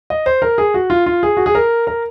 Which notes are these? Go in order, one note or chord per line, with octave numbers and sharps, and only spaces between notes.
D#5
C5
A#4
G#4
F#4
F4
F4
G#4
F#4
G#4
A#4
A#4